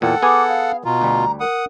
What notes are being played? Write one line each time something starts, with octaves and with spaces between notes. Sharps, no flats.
E2 A#2 A4 F#5 G5
B3 G#4 G#5 D6
F5
B2 F4 A#5
D2 G3
A#4 F#5 D#6